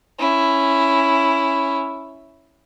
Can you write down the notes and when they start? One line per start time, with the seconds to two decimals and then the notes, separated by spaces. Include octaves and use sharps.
0.19 C#4 E4